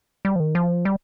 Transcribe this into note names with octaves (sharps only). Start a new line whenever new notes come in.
G3
F3
D#3
F3
G3